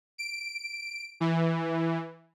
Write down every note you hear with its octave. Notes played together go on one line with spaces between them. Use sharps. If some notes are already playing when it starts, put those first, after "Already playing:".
D7
E3